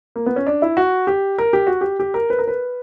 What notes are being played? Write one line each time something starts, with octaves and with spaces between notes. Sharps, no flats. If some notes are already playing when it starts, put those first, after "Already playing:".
A#3
B3
C#4
D4
E4
F#4
G4
A#4
G4
F#4
G4
G4
A#4
B4
A#4
B4